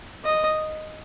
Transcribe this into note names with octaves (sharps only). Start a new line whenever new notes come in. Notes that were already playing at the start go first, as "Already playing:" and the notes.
D#5